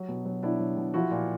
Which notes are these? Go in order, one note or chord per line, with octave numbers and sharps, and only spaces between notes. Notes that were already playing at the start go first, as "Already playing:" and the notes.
Already playing: F#3
B2
F#3
B2 D4 E4
F#3
B2
F3 E4 F#4
A#2